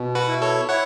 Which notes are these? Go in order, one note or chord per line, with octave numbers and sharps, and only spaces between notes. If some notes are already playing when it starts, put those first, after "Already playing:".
Already playing: B2
F#4 B4
E4
A4 C#5
E4 C#5 F#5